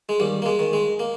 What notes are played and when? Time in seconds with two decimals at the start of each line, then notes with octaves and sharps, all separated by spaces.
0.09 G#3
0.20 D#2 G3
0.42 A#3
0.46 G#3
0.59 D#3
0.73 G#3
0.99 A#3